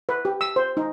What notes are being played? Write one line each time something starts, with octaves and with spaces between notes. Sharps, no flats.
B4
G4
E6
C5
D#4